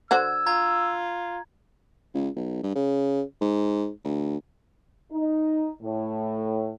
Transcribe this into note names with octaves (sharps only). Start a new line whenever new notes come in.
D3 F#4 C5 E6 G#6
F4 A#5 G#6
C#2
B1
G2
C#3
G#2
D2
D#4
A2